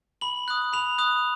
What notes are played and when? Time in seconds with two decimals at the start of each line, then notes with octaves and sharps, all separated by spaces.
0.21 B5 F#7
0.48 D#6 F#6
0.73 B5 F7
0.98 D#6 F#6